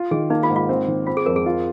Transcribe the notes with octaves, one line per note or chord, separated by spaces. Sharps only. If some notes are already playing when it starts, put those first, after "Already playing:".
Already playing: F4
D#3 G#4
A#3 D#4
F4
G#2
F4
C4
D#3
C4 F4
G#4
F2 A#4
G#4
F4